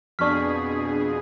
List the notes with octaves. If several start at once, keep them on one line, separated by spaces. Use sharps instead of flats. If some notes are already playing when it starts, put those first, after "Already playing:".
F2 B2 D4 G#4 C#6 F6 B6